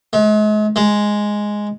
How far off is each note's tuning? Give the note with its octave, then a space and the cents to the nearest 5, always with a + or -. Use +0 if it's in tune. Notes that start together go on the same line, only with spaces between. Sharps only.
G#3 +40
G#3 +0